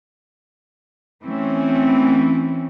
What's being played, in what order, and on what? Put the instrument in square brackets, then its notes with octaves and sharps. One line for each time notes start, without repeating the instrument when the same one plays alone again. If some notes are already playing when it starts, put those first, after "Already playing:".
[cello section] E3 A3 C4 C#4